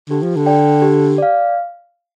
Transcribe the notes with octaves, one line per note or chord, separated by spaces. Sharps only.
D3 G4
F3
D3
D5 G5
G4
D5 F5